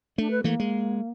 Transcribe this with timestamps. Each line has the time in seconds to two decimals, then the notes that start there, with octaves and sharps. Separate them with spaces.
0.18 A3 D4
0.31 B4
0.44 E3 A3 A#3
0.60 G#3